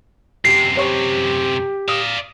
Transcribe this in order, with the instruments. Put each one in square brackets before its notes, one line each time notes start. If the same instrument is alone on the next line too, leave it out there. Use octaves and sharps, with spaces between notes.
[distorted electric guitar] F#2 C3 [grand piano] G4 [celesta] C7
[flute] G4 [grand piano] C5 C#5 C#6
[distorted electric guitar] D5 F5 [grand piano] D#6 E7